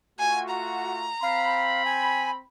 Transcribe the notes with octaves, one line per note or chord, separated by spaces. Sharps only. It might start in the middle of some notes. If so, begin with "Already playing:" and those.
A3 F4 F#4 G#5
A#5
C4 F5 G5 B5
G#5